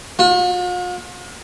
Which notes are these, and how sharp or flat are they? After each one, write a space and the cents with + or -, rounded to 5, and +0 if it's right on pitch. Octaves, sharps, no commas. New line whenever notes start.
F4 +45